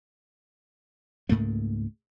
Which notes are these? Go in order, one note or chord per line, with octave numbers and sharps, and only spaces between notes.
C#2 G#2 A3 A#3